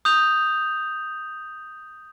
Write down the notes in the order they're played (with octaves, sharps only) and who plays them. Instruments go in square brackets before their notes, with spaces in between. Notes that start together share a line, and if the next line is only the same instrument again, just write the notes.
[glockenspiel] D#6 G6 F7